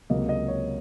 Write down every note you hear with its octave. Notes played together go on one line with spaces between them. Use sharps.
C#2 C3 F#3 A#3 D#5
D#5
C#5